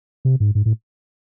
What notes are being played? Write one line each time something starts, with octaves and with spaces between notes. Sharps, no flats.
C3
G#2
G#2
A2